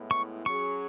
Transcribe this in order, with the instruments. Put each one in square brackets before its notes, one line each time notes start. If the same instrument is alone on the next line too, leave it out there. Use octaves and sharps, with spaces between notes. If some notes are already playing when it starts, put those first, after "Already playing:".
Already playing: [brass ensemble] A2 G#3 B3 E4
[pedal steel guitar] C#6
[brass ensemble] F#3 C#4 G#4 [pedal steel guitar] C#6